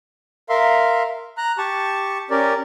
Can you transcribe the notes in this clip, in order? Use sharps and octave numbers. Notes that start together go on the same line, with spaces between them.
A#4 E5 F5 C6
A#5 F#6
G4 A5 C#6
C#4 G4 A#4 D5